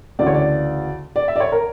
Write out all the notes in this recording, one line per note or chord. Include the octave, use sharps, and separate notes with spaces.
D2 C#3 E3 D5
C#5
D5
D5
E5
D5
C#5
A#4